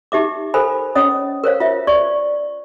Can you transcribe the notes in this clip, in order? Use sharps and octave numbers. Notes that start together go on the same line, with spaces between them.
D#4 G4 E5 D6
A4 A#4 C5 G#5 B5
C#4 C#5 D#5 D#6
A#4 C5 C#5 F5
F4 E5
D5 C#6